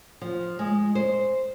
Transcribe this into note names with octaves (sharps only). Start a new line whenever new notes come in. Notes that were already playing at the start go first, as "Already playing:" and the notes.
F3
G#3
C5